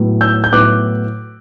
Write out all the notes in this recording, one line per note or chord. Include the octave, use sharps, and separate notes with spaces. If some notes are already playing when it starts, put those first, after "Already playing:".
Already playing: A2 F#3 B3 E4
E6 G6
G6
A2 F#3 B3 E4 D6 F#6